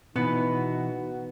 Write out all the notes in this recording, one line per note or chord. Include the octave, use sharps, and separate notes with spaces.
B2 E3 B3 D#4 F#4